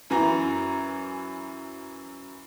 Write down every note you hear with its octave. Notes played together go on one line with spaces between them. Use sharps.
F#2 E3 G#5 A#5